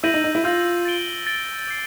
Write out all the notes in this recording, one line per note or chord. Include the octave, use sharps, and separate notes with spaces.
E4 E6 G6 A#6 D#7 F#7
D#4
D#4
E4
F4 E6 G6 A#6 D#7 F#7
A6 D7 G7
A6 D7 G7
D6 G6 C7